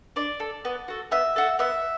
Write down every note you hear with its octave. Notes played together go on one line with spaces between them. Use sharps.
D4 D5
A4
B3
F#4 A4
B3 E5
F#4 A4
B3 E5